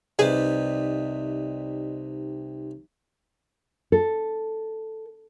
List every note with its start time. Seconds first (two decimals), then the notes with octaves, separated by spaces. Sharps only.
0.19 C2 C3 D#4 G4 G#4 B4 D5 D#5
3.92 A4